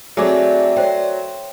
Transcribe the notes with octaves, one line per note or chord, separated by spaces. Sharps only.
F#3 A3 C4 G4 G#4 D5 G#5 D6
C5 C#5 G5